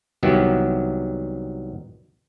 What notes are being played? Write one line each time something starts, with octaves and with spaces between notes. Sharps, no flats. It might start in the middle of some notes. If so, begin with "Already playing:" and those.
C2 D#3 F#3 B3 G4 E5